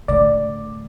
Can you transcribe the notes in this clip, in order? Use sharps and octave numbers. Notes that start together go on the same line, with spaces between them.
A2 D3 D5